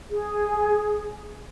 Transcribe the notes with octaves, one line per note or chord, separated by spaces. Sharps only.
G#4